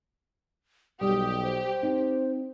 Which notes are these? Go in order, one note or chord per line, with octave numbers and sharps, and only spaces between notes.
B1 G3 G4 D#6
C5
C4 D#4